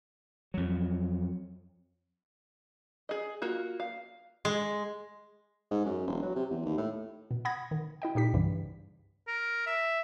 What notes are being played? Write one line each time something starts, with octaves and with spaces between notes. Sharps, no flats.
F2 F#3
G#4 D#5
A#3 F4 F#4
F5
G#3
G#2
F#2
E1
F#3
C3
E2
D#2
A2
B2
F#5 B5 D#6 G#6 A#6
D#3
E4 D#5 G5
A#2 D#4 G4 B6
C2 G2 C#3 E3 G3
A#4
E5